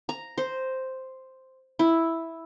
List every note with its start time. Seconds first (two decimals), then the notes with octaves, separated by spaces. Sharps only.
0.09 A#5
0.38 C5
1.79 E4